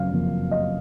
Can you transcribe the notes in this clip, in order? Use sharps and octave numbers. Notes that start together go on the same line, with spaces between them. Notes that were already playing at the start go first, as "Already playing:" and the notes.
Already playing: F#1 F2 F5
F#1 F2 F3 A#3
D#5